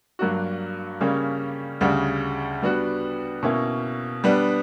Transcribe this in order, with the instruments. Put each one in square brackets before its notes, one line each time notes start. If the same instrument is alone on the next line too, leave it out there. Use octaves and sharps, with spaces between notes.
[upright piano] G2 F#3 A#3 D4 F#4
C#3 G3 A#3 C#4
D2 C#3 G3
G3 B3 D4 F#4
B2 A#3 C#4 E4
G3 B3 D4